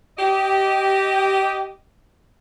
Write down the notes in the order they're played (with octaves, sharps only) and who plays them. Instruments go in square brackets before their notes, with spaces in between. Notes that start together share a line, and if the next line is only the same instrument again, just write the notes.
[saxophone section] G4 D#5